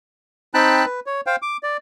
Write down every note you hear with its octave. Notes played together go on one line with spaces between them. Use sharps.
C4 D#4 G5 A5 B5 F#6
B4
C#5
C5 F5 G5
D6
D5